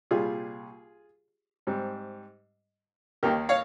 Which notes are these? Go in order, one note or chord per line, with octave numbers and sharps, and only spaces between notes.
C2 A#2 G3 F4 G#4
G#2 G3 C4
D#2 D#3 A#3 G4 A#4
C#5 F5